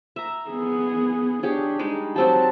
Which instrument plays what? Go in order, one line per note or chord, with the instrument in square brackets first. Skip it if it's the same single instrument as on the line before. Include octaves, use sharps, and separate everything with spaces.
[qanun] E5 A#5
[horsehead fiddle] B3 G#4
[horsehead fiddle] D4 [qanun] G4 G#4 C#5
[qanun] G3 G#3 D#4
[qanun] F#3 C4 G4 [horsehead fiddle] A5